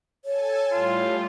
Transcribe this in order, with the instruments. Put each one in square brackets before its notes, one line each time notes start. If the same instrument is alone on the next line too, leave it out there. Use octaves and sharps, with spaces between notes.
[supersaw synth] A4 G#5 A5 [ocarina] C#5
[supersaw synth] A2 G3 [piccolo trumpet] F4